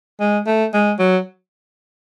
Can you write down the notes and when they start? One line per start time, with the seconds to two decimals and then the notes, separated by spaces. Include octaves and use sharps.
0.20 G#3
0.46 A3
0.74 G#3
0.99 F#3